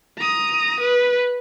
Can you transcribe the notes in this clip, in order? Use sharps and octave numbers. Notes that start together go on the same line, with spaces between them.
A#5 D#6
B4